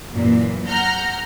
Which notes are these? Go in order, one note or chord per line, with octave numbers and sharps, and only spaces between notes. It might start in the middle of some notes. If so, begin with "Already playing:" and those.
F#2 A#2 E3
F#5 A#5 F6 G6